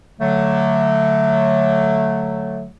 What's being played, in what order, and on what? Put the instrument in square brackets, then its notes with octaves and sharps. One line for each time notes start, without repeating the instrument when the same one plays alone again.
[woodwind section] D3 F#3 A3